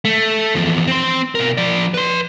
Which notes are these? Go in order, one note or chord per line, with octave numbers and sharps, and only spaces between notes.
A3
E2 F3
C4 C6
B2 A#4
F3 D5
B4 C6